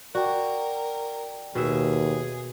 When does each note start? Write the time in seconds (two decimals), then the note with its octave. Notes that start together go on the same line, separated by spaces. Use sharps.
0.15 F#4 A#4 D5 G5
1.55 D#2 B2 G#4 E5